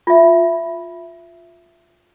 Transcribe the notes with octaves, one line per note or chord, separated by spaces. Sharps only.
F4 E5